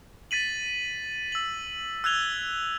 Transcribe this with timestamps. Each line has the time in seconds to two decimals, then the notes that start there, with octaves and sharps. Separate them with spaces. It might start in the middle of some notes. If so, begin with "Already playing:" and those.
0.31 A6 B6 D#7 F#7
1.32 E6 F#7
2.04 E6 F#6 G#6 F7 G7